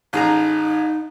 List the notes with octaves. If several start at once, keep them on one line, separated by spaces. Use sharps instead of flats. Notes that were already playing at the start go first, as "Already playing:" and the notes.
A1 D#4 G#4 A#5